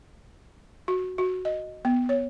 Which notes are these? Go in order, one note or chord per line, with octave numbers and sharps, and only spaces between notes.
F#4
F#4
D#5
B3
C#5